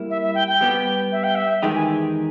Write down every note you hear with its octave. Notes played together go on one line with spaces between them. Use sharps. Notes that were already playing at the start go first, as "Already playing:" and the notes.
Already playing: G3 A#3 E4
E5
E5
G5
G5
G3 B3 G4
E5
G5
E5
E2 D#3 G#3 D#4 G4 G5
G#5